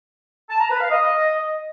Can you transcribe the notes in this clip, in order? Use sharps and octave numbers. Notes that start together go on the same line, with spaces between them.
A5
A#5
B4
F5
D#5